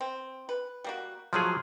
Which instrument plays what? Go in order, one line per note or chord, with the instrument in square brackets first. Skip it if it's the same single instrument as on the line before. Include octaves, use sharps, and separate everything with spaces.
[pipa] C4
B4
G3 A#3 F#4
[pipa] C3 A3 F4 [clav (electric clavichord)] F3 F#3 G#4